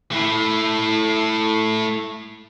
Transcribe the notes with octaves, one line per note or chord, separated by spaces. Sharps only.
A3 E4